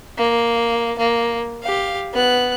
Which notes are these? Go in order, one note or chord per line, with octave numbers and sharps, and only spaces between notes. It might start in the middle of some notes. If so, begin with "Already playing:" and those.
A#3
A#3
G4 F5
B3 F#6